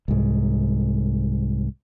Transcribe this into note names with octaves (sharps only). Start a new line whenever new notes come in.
C2 G#2